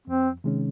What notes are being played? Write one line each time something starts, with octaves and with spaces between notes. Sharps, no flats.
F2 C4
C3 D#3 G#3 C#4